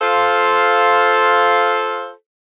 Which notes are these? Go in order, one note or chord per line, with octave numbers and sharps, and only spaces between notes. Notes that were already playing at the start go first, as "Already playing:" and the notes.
F4 A4 C5 F5